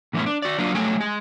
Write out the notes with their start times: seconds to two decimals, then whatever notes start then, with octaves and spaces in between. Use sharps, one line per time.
0.13 A2 E3 G#3 A3 B3 C#4
0.26 D4
0.42 F#4 D5
0.58 F#3 A#3 D4 F4
0.74 F#3 A3 C#4 G5 G#5
0.97 G#3 G#4